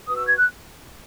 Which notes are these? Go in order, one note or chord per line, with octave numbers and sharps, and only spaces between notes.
F#4 B4 D#6
E6
G#6
F#6